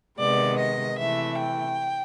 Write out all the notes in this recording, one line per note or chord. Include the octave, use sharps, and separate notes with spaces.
C3 D#3 G#3 B3 D5
D#5
C3 E3 A3 E5
G5